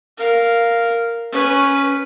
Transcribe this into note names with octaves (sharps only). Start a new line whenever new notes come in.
A#4 F5
C#4 B4